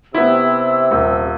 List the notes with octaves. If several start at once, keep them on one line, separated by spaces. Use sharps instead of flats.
C3 B3 E4 E6
D#1